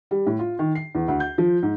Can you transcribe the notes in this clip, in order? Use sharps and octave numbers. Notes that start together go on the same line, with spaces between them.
G3
A2
F4
D#3
C7
E2
D2
G6
F3
G#2